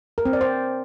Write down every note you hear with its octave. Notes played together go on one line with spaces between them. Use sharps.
A#4
C4
D5
C5